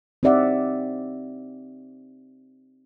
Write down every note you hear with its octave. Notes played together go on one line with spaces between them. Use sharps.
C4 D#4 G4 D5 E5 F#5